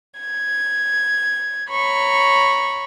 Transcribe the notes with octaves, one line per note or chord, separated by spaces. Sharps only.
G#6
C#5 A#5 B5 C#6